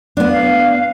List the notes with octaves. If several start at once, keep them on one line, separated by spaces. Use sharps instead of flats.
B3 D4
F5